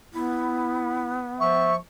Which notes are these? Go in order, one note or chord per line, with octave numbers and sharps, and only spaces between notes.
B3 E4
F3 E5 C#6